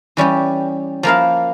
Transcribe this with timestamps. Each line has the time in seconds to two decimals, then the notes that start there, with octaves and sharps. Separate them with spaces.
0.17 E3 G3 C#4 G4
1.03 F3 A#3 E4 A#4 F5